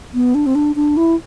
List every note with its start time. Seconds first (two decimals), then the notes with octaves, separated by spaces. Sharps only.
0.14 B3
0.35 D4
0.46 C4
0.55 D4
0.76 D4
0.97 E4